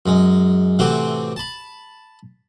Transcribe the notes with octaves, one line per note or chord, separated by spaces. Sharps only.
F#2 G#3
A2 C3 E3 C4 F#4 G4
A5 B5